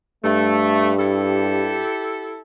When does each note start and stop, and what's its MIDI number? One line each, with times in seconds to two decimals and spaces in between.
0.24 1.82 43
0.24 0.92 57
0.99 2.39 64
0.99 2.39 67
0.99 2.39 69